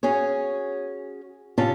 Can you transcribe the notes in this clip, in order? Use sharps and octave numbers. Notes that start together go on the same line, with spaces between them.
C#4 F#4 G#4 C#5
C3 C#4 F4 A5